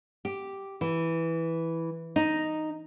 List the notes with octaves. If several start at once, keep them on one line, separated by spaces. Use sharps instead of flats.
G4
E3
D#4